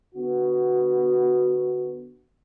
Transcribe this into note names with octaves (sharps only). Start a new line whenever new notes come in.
D3 B3 F#4